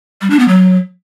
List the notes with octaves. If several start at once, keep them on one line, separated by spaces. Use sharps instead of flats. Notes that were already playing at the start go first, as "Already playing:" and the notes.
G3
D4
B3
F#3